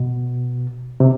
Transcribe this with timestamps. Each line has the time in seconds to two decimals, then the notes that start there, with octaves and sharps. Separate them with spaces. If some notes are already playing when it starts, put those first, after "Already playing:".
Already playing: B2
1.00 C3